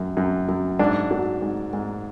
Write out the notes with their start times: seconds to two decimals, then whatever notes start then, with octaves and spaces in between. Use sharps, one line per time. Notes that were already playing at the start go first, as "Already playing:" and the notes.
Already playing: F#2
0.17 F#2
0.49 F#2
0.79 G#2 D4
1.11 F#3
1.42 G#2
1.73 G#2